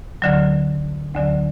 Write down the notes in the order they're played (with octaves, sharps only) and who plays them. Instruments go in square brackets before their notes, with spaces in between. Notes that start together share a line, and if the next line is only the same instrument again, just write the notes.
[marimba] D2 D3 F#3
D2 D3 F#3